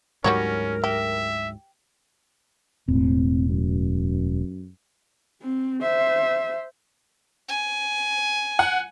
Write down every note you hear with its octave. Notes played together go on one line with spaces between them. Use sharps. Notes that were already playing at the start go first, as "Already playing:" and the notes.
D2 G#2 F#3 G3 C#4 F#4 A#4 C#5
G4 E5
E1 A2 C4
F#2
C4
C5 E5
G#5
F#5